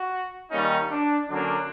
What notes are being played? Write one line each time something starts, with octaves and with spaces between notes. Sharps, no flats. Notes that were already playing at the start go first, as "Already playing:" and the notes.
Already playing: F#4
D#3 G3 A#3 C#4 D#4
D4
D3 F#3 A#3 C#4 D4